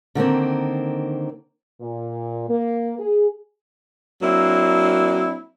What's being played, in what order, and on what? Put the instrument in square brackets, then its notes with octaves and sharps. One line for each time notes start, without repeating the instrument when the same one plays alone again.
[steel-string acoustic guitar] D3 D#3 A#3 C4
[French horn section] A#2
A#3
G#4
[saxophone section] F#3 A#3 C4 D4 E4